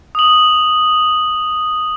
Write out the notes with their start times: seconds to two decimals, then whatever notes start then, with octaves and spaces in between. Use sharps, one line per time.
0.15 D#6 F#7